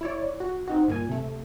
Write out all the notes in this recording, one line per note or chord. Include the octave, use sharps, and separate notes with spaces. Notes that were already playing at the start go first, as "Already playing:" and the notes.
E4 C#5 D5
F#4
C4 D#4 F#4
G1 A#2 G#5
C3 A3